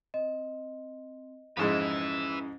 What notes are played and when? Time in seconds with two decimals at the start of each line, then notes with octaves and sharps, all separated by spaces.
0.14 C4 D#5
1.57 F2 G#2 G#3 C#4 E4 B4 E5 A#5